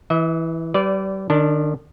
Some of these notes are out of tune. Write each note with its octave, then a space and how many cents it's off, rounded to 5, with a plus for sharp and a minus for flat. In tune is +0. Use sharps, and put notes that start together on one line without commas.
E3 -5 E5 -45
G3 -30 B4 +20 D5 -10
D#3 -40 D4 -15 A5 +0